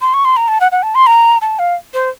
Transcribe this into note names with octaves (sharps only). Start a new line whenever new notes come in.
C6
C#6
C6
A#5
A5
F#5
F#5
A5
C6
A#5
A5
F5
C5